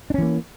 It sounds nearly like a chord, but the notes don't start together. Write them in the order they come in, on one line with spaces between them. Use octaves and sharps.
D4 C#4 E3 A#3